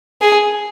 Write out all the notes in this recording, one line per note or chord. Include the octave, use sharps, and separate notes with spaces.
G#4